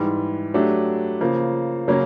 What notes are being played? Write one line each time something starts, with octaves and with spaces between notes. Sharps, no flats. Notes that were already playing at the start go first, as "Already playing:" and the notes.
Already playing: G#2 E3 G3
F#3 A3 D4 G4
C#3 F3 A#3
C#3 F#3 A#3 C#4